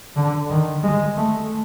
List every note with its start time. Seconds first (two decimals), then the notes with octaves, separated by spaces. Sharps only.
0.16 D3
0.50 D#3
0.83 G#3
1.17 A3